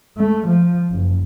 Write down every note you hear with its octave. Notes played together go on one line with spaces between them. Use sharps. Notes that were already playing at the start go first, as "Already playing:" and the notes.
A3
F3
F#1